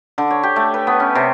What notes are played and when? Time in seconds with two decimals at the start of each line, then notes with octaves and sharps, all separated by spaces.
0.18 D3
0.31 C#5
0.43 G4
0.56 A3
0.74 B4
0.87 B3
1.00 C#4
1.15 C3